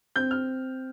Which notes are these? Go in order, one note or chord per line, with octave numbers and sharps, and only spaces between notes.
C4 G6
F6